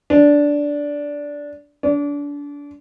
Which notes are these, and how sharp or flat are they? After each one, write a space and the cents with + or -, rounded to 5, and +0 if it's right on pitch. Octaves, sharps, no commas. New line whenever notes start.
D4 -10
D4 -30